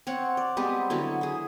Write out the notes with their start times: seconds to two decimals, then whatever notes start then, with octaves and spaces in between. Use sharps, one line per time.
0.07 C4 C#5 F#5
0.37 D5
0.57 G3 G#3 B3 C4
0.90 D3 F#3 B3 E4
1.21 E4 G#4